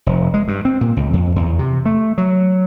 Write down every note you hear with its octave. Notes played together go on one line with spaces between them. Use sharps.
F1
G#3
G2
C4
A#2
C#2
F2
E2
C3
A3
F#3